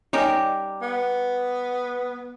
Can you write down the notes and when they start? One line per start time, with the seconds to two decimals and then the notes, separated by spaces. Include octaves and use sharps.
0.13 G3 C#4 D#4 G4 A#4
0.82 B3